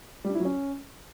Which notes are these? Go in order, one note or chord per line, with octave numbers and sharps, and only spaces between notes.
G3
D4
E4
F#3
C#4